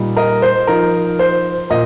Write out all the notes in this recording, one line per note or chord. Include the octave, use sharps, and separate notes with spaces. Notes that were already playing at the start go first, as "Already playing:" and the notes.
Already playing: A#2 G3 D#4
A#4 D#5
C5
F3 D#4 A#4
C5
A#2 A#4 D#5